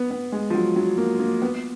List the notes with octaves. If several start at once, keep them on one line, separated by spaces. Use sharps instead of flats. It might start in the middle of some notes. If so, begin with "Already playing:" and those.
Already playing: B3
B3
G#3
F3
F#3
F#3
A#3
A#3
B3